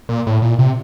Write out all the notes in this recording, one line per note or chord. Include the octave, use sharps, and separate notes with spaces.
A#2
A2
A#2
C3